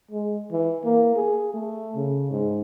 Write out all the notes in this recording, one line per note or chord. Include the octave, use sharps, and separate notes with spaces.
G#3
E3
A#3
G#4
A3
C#3
G#2